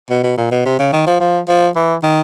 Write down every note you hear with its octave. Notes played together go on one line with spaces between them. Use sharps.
B2
B2
A#2
B2
C3
C#3
D#3
F3
F3
F3
E3
D#3